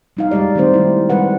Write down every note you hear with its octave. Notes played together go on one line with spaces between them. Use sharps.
G3 D#4 F5
G3 G#3 G4 D5
D#3 A3 C4 D#4 C5
G3 E4
G3 G#3 B4 F#5